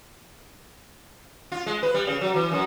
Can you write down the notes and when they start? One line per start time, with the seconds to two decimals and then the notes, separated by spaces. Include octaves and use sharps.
1.52 F4
1.66 G#3
1.83 B4
1.94 G3
2.07 C#3
2.21 F#3
2.34 E3
2.51 F#2